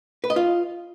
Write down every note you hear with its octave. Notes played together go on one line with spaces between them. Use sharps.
B4
D#5
F4